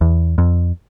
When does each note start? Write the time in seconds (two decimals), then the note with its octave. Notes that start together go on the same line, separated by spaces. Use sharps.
0.01 E2
0.38 F2